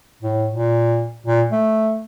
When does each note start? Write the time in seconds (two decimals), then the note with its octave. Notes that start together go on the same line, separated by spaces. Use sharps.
0.22 A2
0.53 A#2
1.26 A#2
1.51 A3